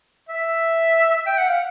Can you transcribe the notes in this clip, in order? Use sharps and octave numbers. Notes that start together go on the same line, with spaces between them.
E5
G5
F#5
F5